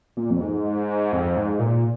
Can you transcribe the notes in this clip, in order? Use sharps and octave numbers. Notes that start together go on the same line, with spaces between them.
A#2
F2
G#2
F2
G#2
A#2